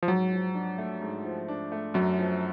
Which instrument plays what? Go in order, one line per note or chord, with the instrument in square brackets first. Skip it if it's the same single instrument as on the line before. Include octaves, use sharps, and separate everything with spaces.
[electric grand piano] F3
[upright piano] G#2 [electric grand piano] F#3
[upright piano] F3
D4
A3
G#2
F3
D4
A3
[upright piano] F#2 [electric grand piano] F#3
[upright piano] F3